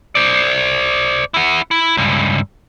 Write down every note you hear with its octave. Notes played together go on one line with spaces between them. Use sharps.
C5 D5
E4 F#5
E4
C#2 G2